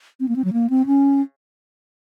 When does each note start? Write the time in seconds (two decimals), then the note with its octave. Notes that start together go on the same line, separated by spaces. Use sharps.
0.20 C4
0.28 A#3
0.36 C4
0.45 F#3
0.53 A#3
0.70 C4
0.86 C#4